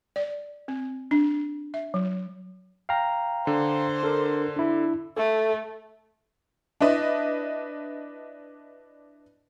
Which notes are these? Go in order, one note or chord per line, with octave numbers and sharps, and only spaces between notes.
D5
C4
D4
E5
F#3
F5 G5 A#5
D3 C5
D4 A4 A#4
D4 E4
A3 A4
D4 E4 B4 D#5